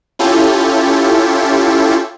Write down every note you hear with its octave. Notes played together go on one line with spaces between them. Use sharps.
C#4 E4 F4 G4 A4